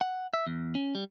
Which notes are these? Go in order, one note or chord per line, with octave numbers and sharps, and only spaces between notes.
F#5
E5
E2
C#4
G3